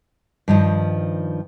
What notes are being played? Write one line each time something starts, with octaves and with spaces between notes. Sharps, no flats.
G2 D#3 F3